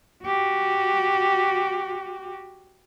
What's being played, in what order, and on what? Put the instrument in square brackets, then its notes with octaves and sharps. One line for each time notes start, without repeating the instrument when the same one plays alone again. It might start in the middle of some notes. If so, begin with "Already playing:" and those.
[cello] F#4 G4